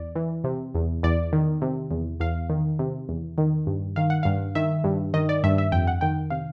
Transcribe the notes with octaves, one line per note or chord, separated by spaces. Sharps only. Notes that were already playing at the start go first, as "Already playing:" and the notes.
Already playing: E2 D5
E3
C3
E2
E2 D5
D#3
C3
E2
E2 F5
D#3
C3
E2
D#3
G2
D#3 F5
F#5
G2 F5
D#3 E5
G2
D#3 D#5
D5
G2 E5
E5
F2 G5
F#5
D#3 G5
C3 F5